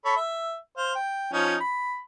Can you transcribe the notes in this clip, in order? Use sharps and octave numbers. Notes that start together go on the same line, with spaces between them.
A4 C#5 B5
E5
C5 F5
G5
F3 C#4 D#4
B5